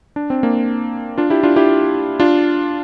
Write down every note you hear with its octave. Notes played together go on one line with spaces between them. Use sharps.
D4
C4
A#3 D4
D4 F4
E4 G4
D4 F4
E4 G4
D4 F4